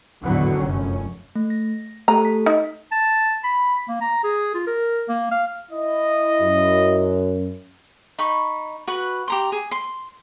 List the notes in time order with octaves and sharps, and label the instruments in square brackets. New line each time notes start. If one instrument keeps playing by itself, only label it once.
[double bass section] G#1 E2 A2 D3 F#3 B3
F1 A#1 F#2 C#4
[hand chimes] A3
A#6
[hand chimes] A3 G4 A4 [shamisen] A#5
[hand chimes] B6
[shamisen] D#4
[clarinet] A5
B5
A#3
A#5
G#4
F4
A#4
A#3
F5
[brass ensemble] E4 D#5
[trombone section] F#2
[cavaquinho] D#4 B5 C#6
F#4 B4
G4 A#5 C6
G#4
C6